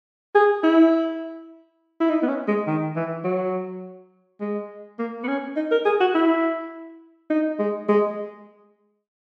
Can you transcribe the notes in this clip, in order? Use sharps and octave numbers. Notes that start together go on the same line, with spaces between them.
G#4
E4
E4
D#4
B3
C#4
G#3
D#3
E3
F#3
G#3
A#3
B3
C#4
D#4
A#4
G#4
F#4
E4
D#4
G#3
G#3